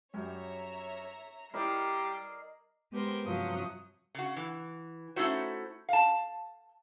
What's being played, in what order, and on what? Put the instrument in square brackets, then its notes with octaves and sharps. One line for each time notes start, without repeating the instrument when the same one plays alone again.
[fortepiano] F#2 G3 [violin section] C#5 E5 A#5
[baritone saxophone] G3 [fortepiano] E4 [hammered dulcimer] A#4 D5 D#5 [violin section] C7
[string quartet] G#3 B3 G4 A#4 C5
G2 C3 F3 F#3 D#6
[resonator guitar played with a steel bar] C#3 F#4
E3
A3 C#4 D#4 E4 F#4 C5
F5 A5